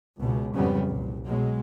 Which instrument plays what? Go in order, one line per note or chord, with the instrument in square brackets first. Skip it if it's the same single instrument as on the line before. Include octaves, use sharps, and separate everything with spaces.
[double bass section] C#2 B2
F2 G#2 C#3 F#3 G3 B3
C2 A#2
B2 F#3 G#3